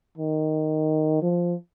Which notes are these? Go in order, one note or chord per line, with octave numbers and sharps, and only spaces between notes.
D#3
F3